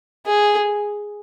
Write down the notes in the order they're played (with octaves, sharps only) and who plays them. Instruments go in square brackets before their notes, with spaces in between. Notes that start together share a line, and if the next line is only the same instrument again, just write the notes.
[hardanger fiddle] G#4